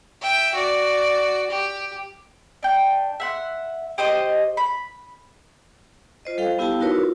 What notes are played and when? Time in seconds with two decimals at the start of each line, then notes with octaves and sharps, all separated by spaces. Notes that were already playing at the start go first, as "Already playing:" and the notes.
0.21 E5 G5
0.55 F#4 D5
1.50 G4
2.63 D4 G5
3.20 E5 F#5 C6
3.98 G4 C5 D#5 D#6
4.57 B5
6.25 F4 C5 D#5
6.38 G3 A4 C5 F5 G5
6.59 B3 E4 G4 F5 G5 A5
6.80 D#4 E4 F#4 A#4 B4 C#5
6.95 F4